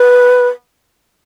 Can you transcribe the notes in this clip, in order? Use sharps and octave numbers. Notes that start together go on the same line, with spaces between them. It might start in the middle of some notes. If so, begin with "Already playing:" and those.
Already playing: B4